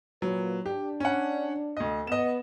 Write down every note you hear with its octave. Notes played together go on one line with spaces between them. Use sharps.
A#2 F#3 B4
D4 G4
C#4 F#5
D2 D#5
B3 D#5 E7